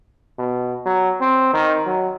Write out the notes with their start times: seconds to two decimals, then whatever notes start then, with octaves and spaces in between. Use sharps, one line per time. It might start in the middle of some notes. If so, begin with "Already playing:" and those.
0.38 B2
0.86 F#3
1.21 C4
1.53 D#3
1.86 F#3